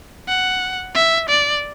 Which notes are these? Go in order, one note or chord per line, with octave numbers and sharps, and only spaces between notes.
F#5
E5
D5